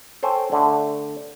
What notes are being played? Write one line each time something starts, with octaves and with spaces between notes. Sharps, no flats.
A4 C5 C#5 G5 G#5
D3 A3